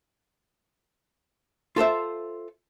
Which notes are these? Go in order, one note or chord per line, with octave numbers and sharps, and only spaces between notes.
F4 A4 C5 E5